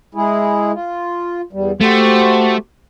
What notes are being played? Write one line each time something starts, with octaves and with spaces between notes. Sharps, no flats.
G#3 E4 G#4
F4
E2 G3
A3 F#4 G4 C5